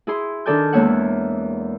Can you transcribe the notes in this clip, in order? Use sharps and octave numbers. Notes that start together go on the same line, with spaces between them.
E4 G#4 C6
D#3 D4 A4 D5 G#5 G6
E2 G#3 A#3 C#5 E5 F#5